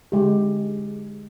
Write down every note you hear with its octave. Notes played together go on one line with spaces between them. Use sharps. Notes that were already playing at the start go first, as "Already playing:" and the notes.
D3 G#3 G4